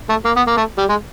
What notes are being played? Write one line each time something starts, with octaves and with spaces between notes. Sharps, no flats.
A3
A#3
B3
A#3
A3
G3
G#3